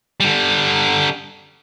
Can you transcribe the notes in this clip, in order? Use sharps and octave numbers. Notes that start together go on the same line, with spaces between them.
D3 G3